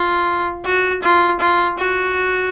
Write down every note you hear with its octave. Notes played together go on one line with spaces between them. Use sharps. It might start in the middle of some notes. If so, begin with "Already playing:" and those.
Already playing: F4
F#4
F4
F4
F#4